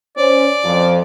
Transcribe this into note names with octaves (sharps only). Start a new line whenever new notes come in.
C#4 C5 D5
F2 F3